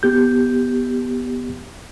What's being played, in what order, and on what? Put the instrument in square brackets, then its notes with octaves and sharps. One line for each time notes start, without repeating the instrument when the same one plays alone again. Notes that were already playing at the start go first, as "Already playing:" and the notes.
[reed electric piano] B3 G4 G6